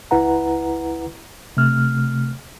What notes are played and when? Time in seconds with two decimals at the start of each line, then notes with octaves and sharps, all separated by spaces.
0.11 C#2 E4 B4 F#5 A#5
1.57 C3 A3 F6